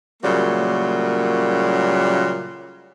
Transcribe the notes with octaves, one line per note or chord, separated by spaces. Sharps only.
A#2 C#3 F#3 G3 A3 A#3